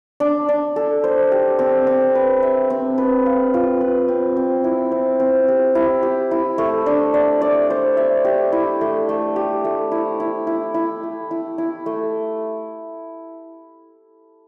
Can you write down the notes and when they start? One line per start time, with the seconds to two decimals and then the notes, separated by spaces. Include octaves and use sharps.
0.20 D4
0.49 D4
0.76 A4
1.04 C5
1.32 G4
1.59 C4
1.87 C4
2.15 B4
2.43 E5
2.70 C4
2.98 B4
3.26 F5
3.54 F4
3.81 B4
4.08 C4
4.36 C4
4.64 E4
4.92 C4
5.20 C4
5.48 G4
5.75 E4
6.03 G4
6.31 E4
6.58 A3
6.86 D4
7.14 D5
7.42 D5
7.70 C5
7.97 E5
8.25 G4
8.52 E4
8.81 A3
9.09 A3
9.36 G4
9.65 A3
9.92 E4
10.20 E4
10.47 E4
10.74 E4
11.03 A3
11.31 E4
11.58 E4
11.86 A3